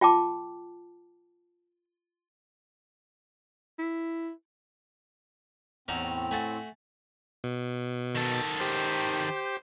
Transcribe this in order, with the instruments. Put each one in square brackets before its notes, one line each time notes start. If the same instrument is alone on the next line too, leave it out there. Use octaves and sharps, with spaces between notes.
[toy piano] F4 G5 A5 D6
[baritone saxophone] E4
[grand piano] E2 [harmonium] A2 C4 [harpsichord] C#4 D#4 F#4
[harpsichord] A3 F#4 [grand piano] G#5 A6
[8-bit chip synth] B2
[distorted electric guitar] D#3 A4
[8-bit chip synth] G4 C5